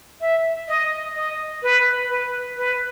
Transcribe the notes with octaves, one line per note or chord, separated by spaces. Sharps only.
E5
D#5
D#5
B4
B4
B4